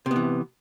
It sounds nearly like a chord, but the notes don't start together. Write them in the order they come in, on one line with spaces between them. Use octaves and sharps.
C3 B3 E3